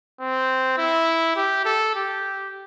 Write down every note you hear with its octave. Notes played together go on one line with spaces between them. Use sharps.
C4
E4
G4
A4
G4